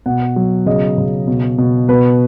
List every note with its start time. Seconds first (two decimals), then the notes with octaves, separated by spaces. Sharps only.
0.06 B2 F#5
0.36 F#3
0.66 C#3 D#5
0.98 C#3
1.28 B2
1.58 B2
1.88 B2 B4